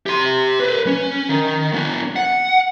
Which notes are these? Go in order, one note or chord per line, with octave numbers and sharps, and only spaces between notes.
G4 C6
B4 C5
C#4
D#3
B3 D4
F#5